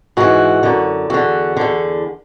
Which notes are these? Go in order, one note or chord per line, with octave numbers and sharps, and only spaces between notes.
G#2 E3 F#4
F#2 D3
E2 D3 F#4
E2 D3